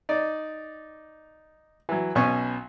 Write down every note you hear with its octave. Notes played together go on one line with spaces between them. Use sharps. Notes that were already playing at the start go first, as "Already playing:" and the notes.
D#4 D5
E3 F#3
B1 B2 C#4 B4 G#5 C#6